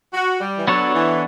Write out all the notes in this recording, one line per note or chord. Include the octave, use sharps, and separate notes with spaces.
F#4
G3
E3
F#3 B3 D4 A4 C#5
E3